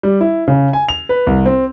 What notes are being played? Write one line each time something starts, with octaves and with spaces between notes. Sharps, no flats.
G3
E4
C#3
G#5
F7
B4
C2
C4